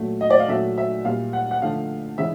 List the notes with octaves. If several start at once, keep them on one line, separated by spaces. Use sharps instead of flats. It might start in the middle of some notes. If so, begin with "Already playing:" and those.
Already playing: A#2 F#3 A3
D#5
D5
F5
A#2 F#3 A3 E5
E5
A#2 G3 F5
F#5
F#5
D3 F3 A3 F5
C#3 E3 G#3 E5